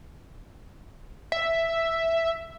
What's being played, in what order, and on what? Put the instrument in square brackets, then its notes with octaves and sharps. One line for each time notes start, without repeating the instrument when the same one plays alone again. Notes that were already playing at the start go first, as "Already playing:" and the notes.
[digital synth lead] E5